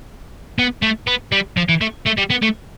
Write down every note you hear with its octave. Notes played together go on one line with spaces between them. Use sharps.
B3
A3
B3
G3
F3
E3
A3
A3
G3
B3
A3